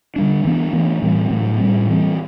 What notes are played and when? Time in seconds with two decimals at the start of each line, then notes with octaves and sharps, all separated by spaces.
0.16 D3 G3 D4
0.45 E3 B3 D4
0.73 E3 A3 D4
1.02 A2 E3 G3 C4
1.31 A2 F#3 A3
1.59 A2 G3 C4
1.89 E3 G3 C4